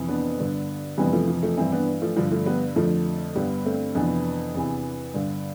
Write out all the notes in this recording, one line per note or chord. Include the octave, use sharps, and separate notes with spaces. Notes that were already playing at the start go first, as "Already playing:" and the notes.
Already playing: F2 C3 E3
B3 D4
G2 D3
F2 C3 E3 G3 B3
F3 A3
F3
F3 A3
G2 E3 C4 E4
B3 D4
F3 A3
G2 D3 F3
F3 A3
G3 B3
F2 D3 F3 A3
G2 D3 G3 B3
A3 C4
F2 C3 E3 B3 D4
E2 C3 E3
G2 D3